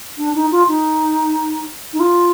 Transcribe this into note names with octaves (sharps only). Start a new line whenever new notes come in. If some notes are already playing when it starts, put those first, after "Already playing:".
D4
D#4
F4
D#4
D#4
F4